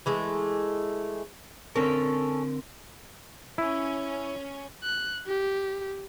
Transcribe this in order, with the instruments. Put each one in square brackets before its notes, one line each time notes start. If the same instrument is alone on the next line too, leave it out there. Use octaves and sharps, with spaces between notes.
[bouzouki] E3 G#3 A3
[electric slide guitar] D3 C4 A#4 [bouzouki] C#4 A4
[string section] C#4 [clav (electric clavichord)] E4
[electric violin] F#6
G4